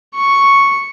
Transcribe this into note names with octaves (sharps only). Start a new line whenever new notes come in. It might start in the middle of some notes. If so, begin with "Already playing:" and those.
C#6